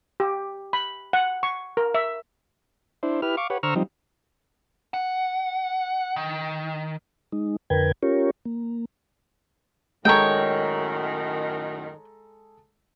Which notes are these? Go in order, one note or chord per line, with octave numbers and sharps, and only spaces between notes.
G4
B5
F#5
C#6
A#4
E5
D4 E4 C5
E4 G4 B4 F6
F5 C#6 D6
G4 B4 C#5 F#5
D3 C5 A#5 C#6 E6 F6
F3 G3 C4 D#4
F#5
D#3
G#3 D#4
F2 D3 A#4 B4 G5 G#6
C#4 F4 G4 A#4 C#5
A#3
F#2 A2 D#3 G#3 A4 C#5 G5 A#5